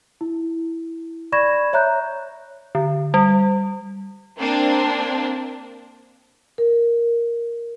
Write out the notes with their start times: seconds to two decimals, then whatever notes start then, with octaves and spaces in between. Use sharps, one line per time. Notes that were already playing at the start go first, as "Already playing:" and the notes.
0.21 E4
1.32 D5 B5 C#6 G#6 A#6 E7
1.73 C#5 E5 A#5 F#6 G6
2.75 D3
3.14 G3
4.39 A#3 C4 D4
6.58 A#4